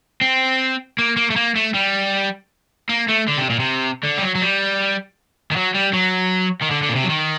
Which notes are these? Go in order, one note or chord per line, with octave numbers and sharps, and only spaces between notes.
C4
A#3
A#3
A3
A#3
A3
G3
A#3
A3
D3
C3
A#2
C3
D3
G3
F#3
F#3
G3
D#3
F#3
G3
F#3
D#3
D3
D3
A#2
C3
F#3
D#3